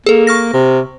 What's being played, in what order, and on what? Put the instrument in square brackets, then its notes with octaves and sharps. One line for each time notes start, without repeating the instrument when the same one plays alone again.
[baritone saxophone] A#3 [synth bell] G#4 A4
[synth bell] C#6 F6 A#6
[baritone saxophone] C3